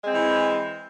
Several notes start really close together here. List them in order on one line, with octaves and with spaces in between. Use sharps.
G#3 C4 E3